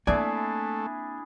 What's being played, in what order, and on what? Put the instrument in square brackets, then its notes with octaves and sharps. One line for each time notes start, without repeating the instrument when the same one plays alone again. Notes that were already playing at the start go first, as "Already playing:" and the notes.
[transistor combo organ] A3 [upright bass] A#3 C4 [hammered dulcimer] D4 E4 G#4 [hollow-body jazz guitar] D5 G#5